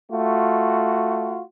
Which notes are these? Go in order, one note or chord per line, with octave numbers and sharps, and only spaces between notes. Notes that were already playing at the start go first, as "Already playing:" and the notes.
A3 F4 F#4